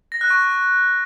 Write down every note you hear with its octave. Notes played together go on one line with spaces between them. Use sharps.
A#6
F#6
C#6